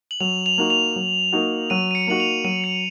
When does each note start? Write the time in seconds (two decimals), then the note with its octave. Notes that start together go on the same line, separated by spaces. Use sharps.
0.11 F#7
0.20 F#3 F7
0.46 F7
0.58 A#3 D#4 F#4
0.70 F7
0.96 F#3
1.33 A#3 D#4 F#4
1.70 F#3 D#7
1.91 D#7
1.95 C#7
2.07 A#3 D#4 F#4 F#7
2.20 F7
2.44 F#3 D#7
2.64 C#7